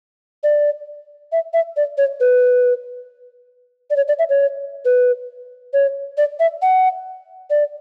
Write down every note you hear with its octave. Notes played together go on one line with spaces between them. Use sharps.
D5
E5
E5
D5
C#5
B4
D5
C#5
D5
E5
C#5
B4
C#5
D5
E5
F#5
D5